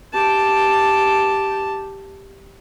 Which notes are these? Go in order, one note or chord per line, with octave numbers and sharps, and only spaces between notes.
G4 A5